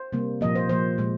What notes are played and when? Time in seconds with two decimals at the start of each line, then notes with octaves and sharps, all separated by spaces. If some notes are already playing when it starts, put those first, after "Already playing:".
Already playing: C5
0.13 C3 G3 A#3
0.41 A#2 F3 A#3 D#5
0.55 C5
0.69 A#2 F3 A#3 C5
0.98 A#2 G#3